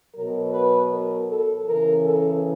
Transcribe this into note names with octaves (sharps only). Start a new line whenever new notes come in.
B2 F#3 A#4
B4
A#4
A4
C#3 E3 A#4
A4